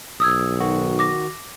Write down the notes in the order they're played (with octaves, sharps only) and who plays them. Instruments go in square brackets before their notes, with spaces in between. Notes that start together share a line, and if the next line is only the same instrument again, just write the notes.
[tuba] B1 [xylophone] D#6 E6 G#6
[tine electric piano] D#3 F#4
[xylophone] D6 A#6